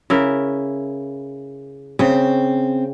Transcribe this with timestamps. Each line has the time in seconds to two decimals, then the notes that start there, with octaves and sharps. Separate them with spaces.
0.10 C#3 E4 A#4
1.99 C#3 C4